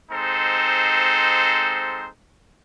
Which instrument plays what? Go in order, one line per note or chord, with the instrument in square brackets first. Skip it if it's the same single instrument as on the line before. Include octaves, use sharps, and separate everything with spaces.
[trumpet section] G#3 C4 D#4 A4 C5